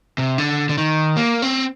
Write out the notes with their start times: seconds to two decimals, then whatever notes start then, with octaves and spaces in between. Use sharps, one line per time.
0.18 C3
0.38 D3
0.69 D3
0.78 D#3
1.17 A#3
1.42 C4